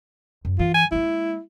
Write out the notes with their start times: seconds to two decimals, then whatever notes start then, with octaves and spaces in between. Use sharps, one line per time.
0.45 F#2
0.59 E3 F4
0.74 G#5
0.92 G#3 A#3 E4